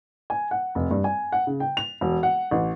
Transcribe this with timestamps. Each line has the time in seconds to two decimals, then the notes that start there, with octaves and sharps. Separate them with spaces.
0.30 G#5
0.51 F#5
0.75 F1
0.91 G2
1.04 G#5
1.32 F#5
1.47 C#3
1.60 G5
1.77 F7
2.01 E1
2.23 F#5
2.51 A1